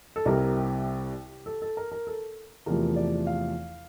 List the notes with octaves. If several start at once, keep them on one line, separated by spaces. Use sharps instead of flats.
A4
C2 C3 G3 A#4
G4
A4
A4
A#4
A#4
A4
E2 C3 F3 A3 A#4
D5
F5